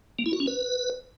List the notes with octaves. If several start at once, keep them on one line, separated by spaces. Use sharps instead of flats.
A#3
E4
F#4
C#4
B4